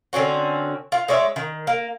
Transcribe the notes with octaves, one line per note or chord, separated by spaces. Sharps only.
D3 C4 C#4 F#4
F4
G#3 C#5 D5 E5
D#3
A#3